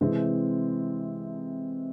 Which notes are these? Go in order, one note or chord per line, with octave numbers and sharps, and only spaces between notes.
C3 E3 G#3 C4